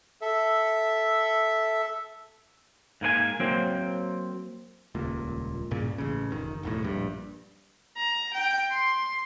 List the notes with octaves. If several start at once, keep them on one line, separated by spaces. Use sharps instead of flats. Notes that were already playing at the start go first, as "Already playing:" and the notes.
A4 E5
G#2 A#3 B4 G#5
F#3 A#3 C4
D#1 C#2 A#2
C2 G2 A#2 C#3
A1 C#3
F1 D#3
E1 B1 A2
A#1 G2
A#5
G5
C6